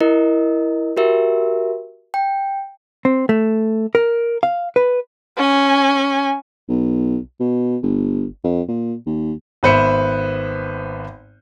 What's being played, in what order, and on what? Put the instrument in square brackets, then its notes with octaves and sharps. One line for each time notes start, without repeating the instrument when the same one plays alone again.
[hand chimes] E4 A#4 D#5
F#4 G4 A#4 E5
G5
[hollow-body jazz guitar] C4
A3
A#4
F5
B4
[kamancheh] C#4 G#5
[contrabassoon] B1
B2
G1
F2
A#2
D#2
[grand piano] G#1 B3 B4 C5 E5 C#7